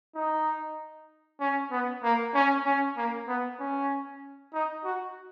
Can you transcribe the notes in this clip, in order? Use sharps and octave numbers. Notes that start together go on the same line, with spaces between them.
D#4
C#4
B3
A#3
C#4
C#4
A#3
B3
C#4
D#4
F#4